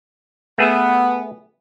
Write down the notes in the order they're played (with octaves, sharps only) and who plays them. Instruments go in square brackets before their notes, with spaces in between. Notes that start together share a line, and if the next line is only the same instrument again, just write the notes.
[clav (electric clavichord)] A3 G#4 E5 [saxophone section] B3